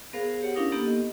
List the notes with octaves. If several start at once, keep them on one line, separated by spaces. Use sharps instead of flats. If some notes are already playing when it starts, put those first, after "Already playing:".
B3 G#4 A#4 C5 F5
G4 C#5 F#5
C#4 D4 E4 A#4 F5 D#6
A#3 B3 D#4 G4 A4
D#5